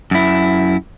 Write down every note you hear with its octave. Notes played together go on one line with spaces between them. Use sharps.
F#2 E4